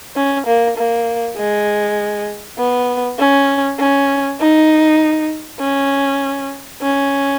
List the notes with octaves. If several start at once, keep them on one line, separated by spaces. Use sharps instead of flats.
C#4
A#3
A#3
G#3
B3
C#4
C#4
D#4
C#4
C#4